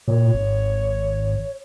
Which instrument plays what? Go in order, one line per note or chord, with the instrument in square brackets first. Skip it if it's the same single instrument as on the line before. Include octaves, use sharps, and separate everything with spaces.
[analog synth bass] A#2 [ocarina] C#5
[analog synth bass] G#1